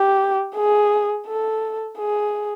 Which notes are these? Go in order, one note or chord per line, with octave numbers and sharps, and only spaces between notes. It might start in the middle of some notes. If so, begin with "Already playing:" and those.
Already playing: G4
G#4
A4
G#4